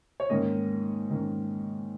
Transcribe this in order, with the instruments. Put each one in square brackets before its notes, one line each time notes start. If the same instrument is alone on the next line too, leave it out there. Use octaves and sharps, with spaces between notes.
[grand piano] C#5
G#2 D#3 A#3 C#4 D#5
G#2 D#3 A#3 C#4